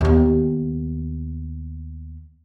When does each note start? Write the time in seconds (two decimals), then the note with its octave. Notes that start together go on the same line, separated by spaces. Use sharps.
0.01 D#2 B3